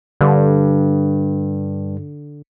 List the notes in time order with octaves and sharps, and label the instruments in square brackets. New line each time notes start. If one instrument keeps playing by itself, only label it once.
[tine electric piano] G2 [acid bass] D3